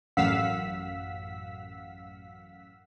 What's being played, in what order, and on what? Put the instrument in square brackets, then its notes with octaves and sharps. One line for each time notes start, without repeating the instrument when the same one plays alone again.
[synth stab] A1 F#2 F5 F#5 E6 B6